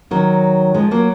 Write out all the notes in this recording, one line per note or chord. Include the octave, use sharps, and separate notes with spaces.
D#3 F#3
F3 G#3
F#3 A#3